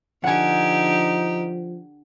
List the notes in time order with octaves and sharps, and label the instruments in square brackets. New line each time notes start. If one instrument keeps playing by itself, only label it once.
[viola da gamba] D3 G4 [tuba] F3 [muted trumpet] D#4 [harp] F#5 G#5